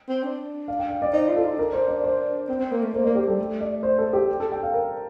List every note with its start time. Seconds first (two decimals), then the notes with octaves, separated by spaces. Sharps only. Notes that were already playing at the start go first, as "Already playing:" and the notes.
0.08 C4
0.23 D4
0.68 F5
0.79 G5
0.90 F5
1.02 D5
1.13 D#4 C5
1.29 F4
1.36 A4
1.43 D#4
1.58 D4 A#4
1.73 C5
1.88 D5
2.04 C5
2.49 C4
2.59 C4
2.72 A#3
2.82 A3
2.94 A#3 C5
3.04 A#3 D5
3.15 G4
3.27 G3 A4
3.39 A3
3.61 D5
3.83 C5
3.98 A4
4.13 G4
4.40 A4
4.52 G5
4.63 F5
4.74 A#4